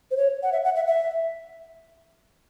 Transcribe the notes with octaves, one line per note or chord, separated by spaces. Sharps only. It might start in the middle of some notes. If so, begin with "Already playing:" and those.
C5
C#5
F#5
E5
F#5
E5
E5